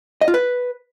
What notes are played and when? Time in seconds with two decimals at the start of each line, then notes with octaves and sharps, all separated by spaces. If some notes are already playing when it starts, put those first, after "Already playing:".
0.21 D#5
0.28 F4
0.34 B4